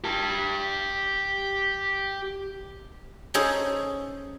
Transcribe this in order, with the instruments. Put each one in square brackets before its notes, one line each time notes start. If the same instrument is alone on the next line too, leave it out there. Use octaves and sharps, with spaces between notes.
[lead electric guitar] G4 A5
[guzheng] C#4 D#4 G#4 A4 C5 C#5